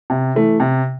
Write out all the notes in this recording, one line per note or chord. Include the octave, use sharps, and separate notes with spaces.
C3
E3 A3
C3